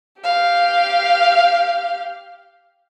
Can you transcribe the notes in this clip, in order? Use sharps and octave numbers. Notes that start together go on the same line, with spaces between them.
G4 F5